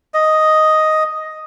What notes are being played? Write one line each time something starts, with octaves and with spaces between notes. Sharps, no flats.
D#5